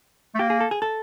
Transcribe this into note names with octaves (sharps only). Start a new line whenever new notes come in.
A3
A#3 G4
G#4
A4
G#4
A4